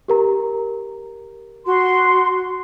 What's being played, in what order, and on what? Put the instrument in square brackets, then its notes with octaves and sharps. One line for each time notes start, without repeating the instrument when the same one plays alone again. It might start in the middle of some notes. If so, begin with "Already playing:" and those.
[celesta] G4 A#4 A#5
[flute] F#4 [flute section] C6